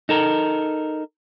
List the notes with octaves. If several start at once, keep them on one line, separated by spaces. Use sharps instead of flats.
D#4 A4 A#4